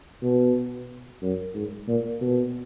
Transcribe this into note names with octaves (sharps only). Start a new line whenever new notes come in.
B2
F#2
G#2
A#2
B2